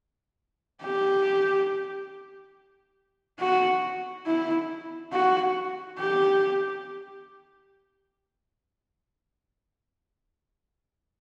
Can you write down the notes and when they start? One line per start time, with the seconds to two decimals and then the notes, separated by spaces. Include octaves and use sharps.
0.82 G4
3.40 F#4
4.26 E4
5.13 F#4
5.99 G4